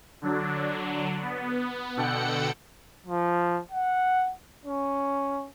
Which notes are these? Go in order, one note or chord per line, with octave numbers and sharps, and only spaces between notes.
D3 F#3 D4
B3
B2 D3 A4 F#5 G5 C#7
F3
F#5
C#4